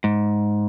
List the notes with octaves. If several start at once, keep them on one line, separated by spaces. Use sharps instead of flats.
G#2